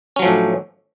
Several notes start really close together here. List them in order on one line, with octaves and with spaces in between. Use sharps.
C#4 F#3 F3 A2 D4